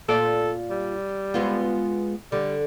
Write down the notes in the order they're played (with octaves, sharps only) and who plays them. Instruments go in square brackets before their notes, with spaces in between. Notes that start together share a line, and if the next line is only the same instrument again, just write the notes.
[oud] A#2 F4 D5 [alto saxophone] A4
[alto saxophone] G3
[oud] G#3 B3 F4
[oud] D3 [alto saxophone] G3